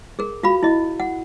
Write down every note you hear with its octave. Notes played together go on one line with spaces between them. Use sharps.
G#4 A#4
F4 F#4 F5 B5
E4 D#5
F#5